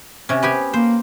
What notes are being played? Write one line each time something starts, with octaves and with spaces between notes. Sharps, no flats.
C3 C#4
B3 G4 G#5
A#3 C5